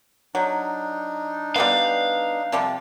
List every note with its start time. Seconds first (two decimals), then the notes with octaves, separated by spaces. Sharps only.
0.35 F#3 D4 D#4
1.56 G3 B3 B4 F5
2.52 C3 F3 G3